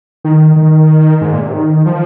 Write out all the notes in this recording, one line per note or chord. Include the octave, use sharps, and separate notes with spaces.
D#3
D#3
G#2
A#2
C3
D#3
F3